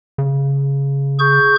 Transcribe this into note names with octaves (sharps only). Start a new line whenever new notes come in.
C#3
G#4 C#6 G6